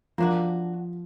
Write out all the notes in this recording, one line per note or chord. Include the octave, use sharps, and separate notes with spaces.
F3 A#3 D4 F#4